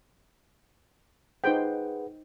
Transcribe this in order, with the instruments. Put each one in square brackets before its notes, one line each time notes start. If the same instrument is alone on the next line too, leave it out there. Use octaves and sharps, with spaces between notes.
[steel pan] D#4 C5 G5 [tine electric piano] G#4 B4 F#5